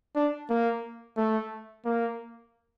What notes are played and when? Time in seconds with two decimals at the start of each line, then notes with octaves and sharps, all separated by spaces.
0.16 D4
0.50 A#3
1.17 A3
1.86 A#3